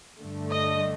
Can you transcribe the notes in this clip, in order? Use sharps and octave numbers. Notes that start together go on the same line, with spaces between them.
G2 D3 A3
D#5